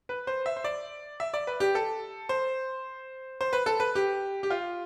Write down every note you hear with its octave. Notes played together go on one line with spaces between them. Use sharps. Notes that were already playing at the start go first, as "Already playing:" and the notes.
B4
C5
E5
C5
D5
E5
D5
B4
G4
A4
C5
C5
B4
A4
B4
G4
G4
F4